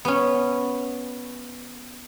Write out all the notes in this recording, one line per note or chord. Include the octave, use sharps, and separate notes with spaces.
B3 C#4